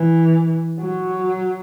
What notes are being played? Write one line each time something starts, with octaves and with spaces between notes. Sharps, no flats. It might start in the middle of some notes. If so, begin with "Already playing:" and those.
Already playing: E3
F#3